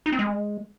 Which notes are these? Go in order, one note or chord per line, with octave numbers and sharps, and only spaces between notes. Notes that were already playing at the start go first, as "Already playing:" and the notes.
D#4
C4
G#3